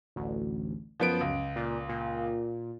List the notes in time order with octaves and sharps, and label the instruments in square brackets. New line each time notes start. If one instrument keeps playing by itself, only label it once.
[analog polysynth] A1 D2
[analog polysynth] F#2 [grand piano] F3 B3 D7
[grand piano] C#2
[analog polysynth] A#2
A#2